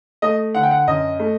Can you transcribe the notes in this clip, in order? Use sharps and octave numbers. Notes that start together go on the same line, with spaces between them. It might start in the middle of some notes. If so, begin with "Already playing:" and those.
A3 D#5
D3 F#5
G5
F#5
F#2 D#5
A3